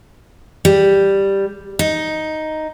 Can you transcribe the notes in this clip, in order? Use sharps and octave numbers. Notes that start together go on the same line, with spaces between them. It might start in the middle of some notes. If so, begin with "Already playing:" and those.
G3
D#4